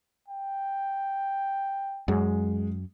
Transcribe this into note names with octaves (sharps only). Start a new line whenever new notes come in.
G5
F#2 G#3